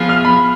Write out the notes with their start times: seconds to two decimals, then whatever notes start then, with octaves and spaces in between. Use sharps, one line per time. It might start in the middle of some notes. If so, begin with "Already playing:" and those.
Already playing: F3 B3 F4 G#4
0.09 F6
0.25 B5